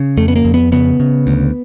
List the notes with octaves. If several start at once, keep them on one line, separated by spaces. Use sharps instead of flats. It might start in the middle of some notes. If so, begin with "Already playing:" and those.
Already playing: C#3
F2 A3
B3
A#3
F2
B3
C#3 B3
C#3
D2